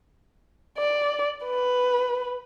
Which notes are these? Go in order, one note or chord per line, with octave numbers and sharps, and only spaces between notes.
D5
B4